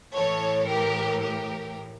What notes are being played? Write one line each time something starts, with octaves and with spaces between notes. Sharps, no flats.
A2 E3 A4 C#5
G4 A#4
G4 A#4